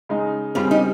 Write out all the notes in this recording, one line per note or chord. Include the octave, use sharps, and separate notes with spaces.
C#3 G#3 D#4
C#3 G3 C4 C#4 F4
D#4 G4